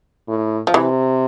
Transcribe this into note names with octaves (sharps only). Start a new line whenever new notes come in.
A2
F3
C3 E3